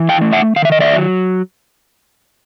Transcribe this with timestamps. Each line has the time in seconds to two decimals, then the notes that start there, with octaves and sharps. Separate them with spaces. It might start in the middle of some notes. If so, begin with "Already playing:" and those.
Already playing: E3
0.09 F5 G5
0.21 A3
0.32 E5 F#5
0.56 D#3 F5
0.65 E5
0.72 D#5
0.80 D5 E5
0.93 F#3